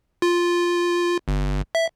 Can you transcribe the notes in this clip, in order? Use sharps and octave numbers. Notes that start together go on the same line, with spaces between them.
F4
G1
E5